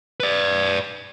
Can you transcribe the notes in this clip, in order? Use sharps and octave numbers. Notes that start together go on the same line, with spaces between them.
B4 D5